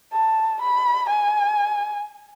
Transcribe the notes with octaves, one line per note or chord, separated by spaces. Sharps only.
A5
B5
G#5